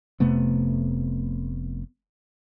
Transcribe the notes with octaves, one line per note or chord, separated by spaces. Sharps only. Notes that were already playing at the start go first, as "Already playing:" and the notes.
F1 C3 A3 B3